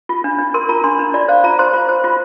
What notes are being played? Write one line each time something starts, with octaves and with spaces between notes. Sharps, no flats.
F4
D4
D4
A#4 C6
F4 A#5
D4 C6
D4
F4 D5
C5 F5
F4 A#5
C5 C6
F4
C5
F4